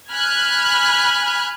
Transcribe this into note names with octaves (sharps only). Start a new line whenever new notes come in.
G#5 B5 F6 F#6 G#6